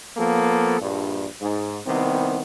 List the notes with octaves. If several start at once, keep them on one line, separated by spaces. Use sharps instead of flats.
F3 A#3 B3 A4
A#1 G2
G#2
C2 C3 D#3 B3